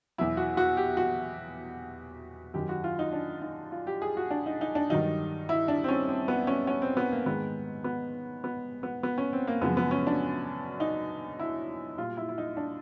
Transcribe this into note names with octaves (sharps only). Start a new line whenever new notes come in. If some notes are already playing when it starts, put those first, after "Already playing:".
E2 B2 F#3 E4
F#4
F#4
G4
F#4
F#2 D#3 F#3 G4
F#4
F4
D#4
D4
D#4
F4
G4
G#4
F#4
D4
D#4
D#4
D4
G2 D#3 F#3 D#4
E4
D4
C4
C#4
C4
B3
C#4
C#4
C4
B3
A#3
G#2 D#3 G#3 B3
B3
B3
B3
B3
C#4
C4
A#3
F#2 C#3 F3 G#3 B3
B3
C#4
D4
D#4
E4
A#2 G3 F4
E4
E4
D#4
D4